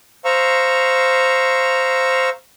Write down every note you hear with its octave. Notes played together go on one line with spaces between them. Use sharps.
C5 F5 A#5 C#6 E6